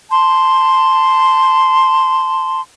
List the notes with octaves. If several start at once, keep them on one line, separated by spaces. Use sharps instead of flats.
A5 C6